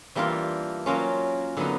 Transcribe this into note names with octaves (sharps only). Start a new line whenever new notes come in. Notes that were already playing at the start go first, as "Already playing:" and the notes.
E3 G3 A#3 D4 F4
F#3 A#3 C#4 F4
D3 F#3 B3 D#4